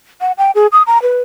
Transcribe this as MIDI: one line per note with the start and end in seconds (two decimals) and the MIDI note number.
0.21 0.32 78
0.38 0.51 79
0.55 0.67 68
0.72 0.82 87
0.87 1.01 82
1.02 1.22 71